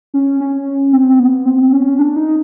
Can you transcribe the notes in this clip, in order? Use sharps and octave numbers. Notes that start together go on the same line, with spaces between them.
C#4
C#4
C4
B3
C4
C#4
D4
D#4